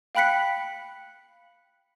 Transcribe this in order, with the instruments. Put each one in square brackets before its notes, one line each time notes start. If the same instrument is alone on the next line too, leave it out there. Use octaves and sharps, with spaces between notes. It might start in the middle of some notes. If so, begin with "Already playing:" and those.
[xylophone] F5 G5 B5 F#6 B6 C#7